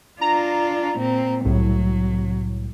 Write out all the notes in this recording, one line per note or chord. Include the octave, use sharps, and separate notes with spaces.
D4 F4 A#5
A#2 C4
C2 A2 F#3